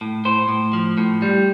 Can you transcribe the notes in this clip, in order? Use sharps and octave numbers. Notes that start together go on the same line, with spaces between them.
A2
A2 C5
A2
F3
A2
G3